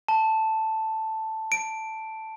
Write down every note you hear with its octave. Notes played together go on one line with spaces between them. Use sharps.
A5
D7